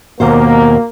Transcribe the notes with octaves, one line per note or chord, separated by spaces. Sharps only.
D#2 B2 A#3 C5